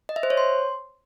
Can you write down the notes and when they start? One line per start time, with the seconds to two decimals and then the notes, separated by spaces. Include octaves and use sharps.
0.09 D#5
0.16 E5
0.23 C5
0.30 C#5
0.37 C6